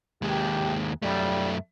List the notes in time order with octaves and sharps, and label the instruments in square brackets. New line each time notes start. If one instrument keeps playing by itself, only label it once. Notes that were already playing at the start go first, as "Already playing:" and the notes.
[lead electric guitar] D#2 G#3 [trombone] G4
[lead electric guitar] F#2 A3 [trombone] G3